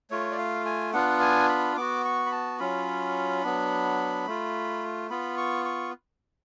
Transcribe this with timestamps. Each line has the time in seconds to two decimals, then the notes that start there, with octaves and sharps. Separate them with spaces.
0.11 A3 F4 C#5
0.32 D5
0.38 F5
0.66 G#5
0.93 B3 D4 F4 F#5
1.21 G#5
1.49 B5
1.77 B3 F#4 D6
2.05 C#6
2.26 B5
2.32 A5
2.60 F#3 C#4 F4 B5
3.43 F#3 B3 D4
4.27 A3 F4
5.10 B3 F4 B5
5.38 C#6
5.65 C#6